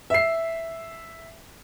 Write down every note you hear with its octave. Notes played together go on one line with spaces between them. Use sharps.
E5 C7